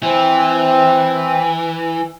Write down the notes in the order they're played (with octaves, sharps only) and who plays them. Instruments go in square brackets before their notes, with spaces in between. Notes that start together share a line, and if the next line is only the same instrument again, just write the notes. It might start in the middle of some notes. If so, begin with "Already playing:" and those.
[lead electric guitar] E3 [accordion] C4